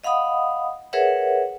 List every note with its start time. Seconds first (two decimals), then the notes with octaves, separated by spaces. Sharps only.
0.04 D#5 F5 F#5 B5 D#6
0.93 G#4 A#4 B4 C#5 E5 F#5